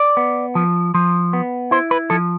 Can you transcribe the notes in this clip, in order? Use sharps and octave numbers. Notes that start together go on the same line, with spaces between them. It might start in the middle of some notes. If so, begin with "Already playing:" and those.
Already playing: D5
B3
F3
F3
B3
E4 C5
B4
F3 A4